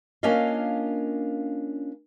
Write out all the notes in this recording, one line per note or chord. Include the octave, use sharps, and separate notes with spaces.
A#3 C#4 D4 F4 D#5 F5